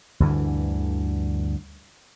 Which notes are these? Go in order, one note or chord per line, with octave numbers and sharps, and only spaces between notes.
D2 G2 D3 E3